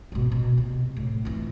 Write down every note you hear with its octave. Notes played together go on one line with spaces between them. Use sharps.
G#2 B2
B2
C3
A2
F2 E3